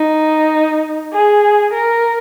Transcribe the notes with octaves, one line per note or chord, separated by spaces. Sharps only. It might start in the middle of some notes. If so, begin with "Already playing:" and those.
Already playing: D#4
G#4
A#4